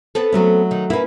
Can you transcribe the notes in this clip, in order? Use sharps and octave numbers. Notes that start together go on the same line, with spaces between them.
B3 C4 A4
F#3 A3 C#4
D#3
A#3 C#4 E4 B4